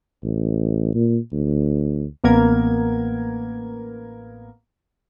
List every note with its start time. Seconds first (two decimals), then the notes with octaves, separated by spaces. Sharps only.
0.23 A1
0.95 A#2
1.32 D2
2.24 A1 A#3 B3 A#4 G#6